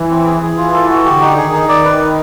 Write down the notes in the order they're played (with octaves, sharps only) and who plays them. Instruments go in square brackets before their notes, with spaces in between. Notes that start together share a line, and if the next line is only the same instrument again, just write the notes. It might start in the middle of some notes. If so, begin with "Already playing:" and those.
Already playing: [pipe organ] E3
[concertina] C4
G#4
[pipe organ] E3 [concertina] G#4
[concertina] F4
A4
F#4
[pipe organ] D3 [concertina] G4
[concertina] D#4
[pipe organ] D#3 [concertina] G#4
[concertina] D#4
[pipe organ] D#3 [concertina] D5
[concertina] B4
D#4